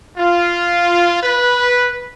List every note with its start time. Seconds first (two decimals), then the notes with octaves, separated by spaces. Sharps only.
0.18 F4
1.22 B4